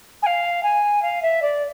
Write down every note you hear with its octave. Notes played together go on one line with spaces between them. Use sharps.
G#5
F5
G#5
F5
E5
D5